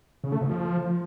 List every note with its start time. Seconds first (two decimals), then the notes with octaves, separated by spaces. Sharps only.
0.24 C#3
0.32 A3
0.41 G#2
0.49 F3